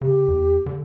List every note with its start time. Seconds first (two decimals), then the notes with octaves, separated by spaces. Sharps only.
0.01 C#3 G4
0.28 E2
0.66 D3